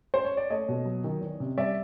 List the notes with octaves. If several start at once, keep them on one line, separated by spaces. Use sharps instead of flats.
C5
C#5
D5
A3 C#5 D#5
B2
F#3
D#3
E2
C3
G3 D5 E5